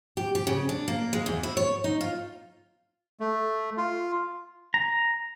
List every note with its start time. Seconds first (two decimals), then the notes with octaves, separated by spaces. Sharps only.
0.17 G4
0.35 G4
0.47 C#3
0.69 D4
0.88 A#3
1.13 G#3
1.26 E2
1.43 E4
1.57 C#5
1.84 D#4
2.01 F4
3.20 A3
3.78 F4
4.74 A#5